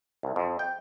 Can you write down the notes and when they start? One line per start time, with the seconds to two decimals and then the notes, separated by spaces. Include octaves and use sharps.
0.23 C2
0.36 F2
0.59 G5